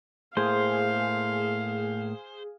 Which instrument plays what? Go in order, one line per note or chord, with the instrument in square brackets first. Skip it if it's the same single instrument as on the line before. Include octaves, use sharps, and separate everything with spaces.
[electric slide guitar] A2 A#3 [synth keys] G#4 [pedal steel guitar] C5 [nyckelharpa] F5